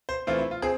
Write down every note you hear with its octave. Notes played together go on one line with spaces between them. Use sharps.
C5
E3 A3 C4 F4
E4
F4
C4 G#4